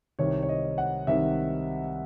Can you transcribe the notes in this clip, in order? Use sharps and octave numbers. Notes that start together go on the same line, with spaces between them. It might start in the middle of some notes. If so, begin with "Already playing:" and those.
C2 C3 D#3 C#5
C#5
D#5
F#5
C2 C3 D#3 E5